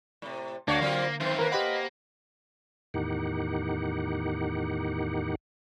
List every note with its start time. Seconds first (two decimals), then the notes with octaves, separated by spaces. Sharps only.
0.22 A2 C3
0.68 D2 A#3 D4 F#4 C#5 D5 F5 A6
0.81 D3 F#3 C4 F4
1.20 F#2 D#3 C4 F4 C5
1.39 A#3 A#4 B4
1.52 G4 B4 C5 D#5 F#5
2.94 E2 A2 D#3 D#4 G4 F#5